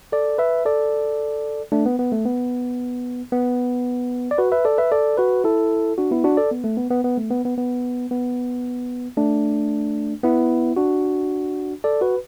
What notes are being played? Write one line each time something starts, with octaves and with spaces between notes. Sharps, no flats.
A4 D5
B4 E5
A4 D5
A3 D4
B3
B3
A3
B3
B3
D5
F#4 B4
B4 E5
A4 D5
B4 E5
A4 D5
F#4 B4
E4 A4
D4 F#4
B3 E4
D4 F#4
A4 D5
B3
A3
B3
B3
B3
A3
B3
B3
B3
B3
A3 D4
B3 E4
D4 F#4
A4 D5
F#4 B4